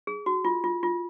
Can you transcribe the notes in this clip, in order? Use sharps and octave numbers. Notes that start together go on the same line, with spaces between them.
G#4
F#4
F4
F4
F4